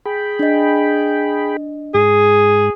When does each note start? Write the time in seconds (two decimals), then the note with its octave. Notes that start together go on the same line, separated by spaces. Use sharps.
0.05 G#4 G5 B5
0.39 D4 D#5
1.94 G#2 G#4